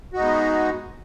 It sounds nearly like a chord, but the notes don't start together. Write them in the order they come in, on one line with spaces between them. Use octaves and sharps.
F#4 D#4 G#3 B3